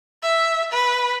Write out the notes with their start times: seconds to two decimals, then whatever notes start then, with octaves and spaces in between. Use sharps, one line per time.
0.23 E5
0.72 B4